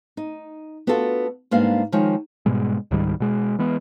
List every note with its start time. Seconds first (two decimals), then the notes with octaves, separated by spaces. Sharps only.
0.17 D#4
0.87 B3 D4 F4 F#4 A4
1.51 G#2 G3 A#3 B3 D4 F5
1.92 D#3 F3 G#3 D#4 C#5
2.46 G#2 B2 G3 G#3
2.91 C#2 G#2 D#3 G3
3.20 B2 G#3
3.59 E3 G#3 B3